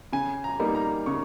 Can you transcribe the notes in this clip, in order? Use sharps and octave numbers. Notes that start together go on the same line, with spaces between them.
C#3 G#5
A#5
G3 A#3 D#4
A#5
C#3 C#6